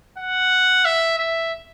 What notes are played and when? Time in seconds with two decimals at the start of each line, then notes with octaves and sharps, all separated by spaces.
0.18 F#5
0.85 E5
1.18 E5